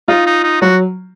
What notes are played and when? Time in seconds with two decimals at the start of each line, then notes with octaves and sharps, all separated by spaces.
0.08 D#4 F4
0.27 D#4
0.44 D#4
0.62 F#3 F#4